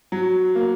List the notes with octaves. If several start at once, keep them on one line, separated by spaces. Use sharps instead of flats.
F#3
A#3